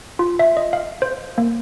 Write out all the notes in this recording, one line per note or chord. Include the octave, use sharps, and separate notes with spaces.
F4
E5
D#5
F5
C5
A#3